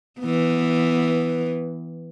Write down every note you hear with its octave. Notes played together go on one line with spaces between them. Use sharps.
E3 B3